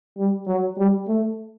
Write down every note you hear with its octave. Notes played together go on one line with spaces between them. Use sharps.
G3
F#3
G3
A3